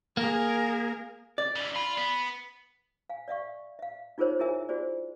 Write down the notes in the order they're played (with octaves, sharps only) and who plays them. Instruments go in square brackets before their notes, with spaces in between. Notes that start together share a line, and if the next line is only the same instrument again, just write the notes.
[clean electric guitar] A#3 [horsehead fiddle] G#4 A#4
[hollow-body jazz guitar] D5
[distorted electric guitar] C#3 E3
[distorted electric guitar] F4 [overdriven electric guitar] B5
[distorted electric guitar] B3
[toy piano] F5 G#5
D5 E5 F5 C#6
E5 F5
D#4 F4 G#4 A#4 C5 C#5
E4 G#4 A#4 E5 G#5
F4 F#4 G#4 C5 D5